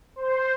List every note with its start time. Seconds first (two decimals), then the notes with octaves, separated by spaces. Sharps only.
0.16 C5